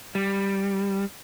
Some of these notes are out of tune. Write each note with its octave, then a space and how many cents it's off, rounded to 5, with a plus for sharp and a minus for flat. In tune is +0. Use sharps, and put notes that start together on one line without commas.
G3 +5